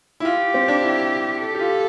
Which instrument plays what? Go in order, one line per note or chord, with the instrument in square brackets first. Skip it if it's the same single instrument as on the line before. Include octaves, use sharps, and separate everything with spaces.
[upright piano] E4
[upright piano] F4 [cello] G4
[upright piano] C4
D4
E4
[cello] A4
[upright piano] G4
F4